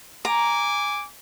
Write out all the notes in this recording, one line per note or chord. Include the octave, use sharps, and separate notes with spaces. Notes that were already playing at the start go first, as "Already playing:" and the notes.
G#5 A#5 D6